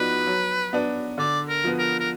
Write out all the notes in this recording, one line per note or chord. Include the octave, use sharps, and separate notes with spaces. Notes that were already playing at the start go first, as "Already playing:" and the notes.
Already playing: F3 B3 D#4 F#4 B4 D5
F#3
B3 D4
D3 D5
A#4
F3 B3
A#4
A#4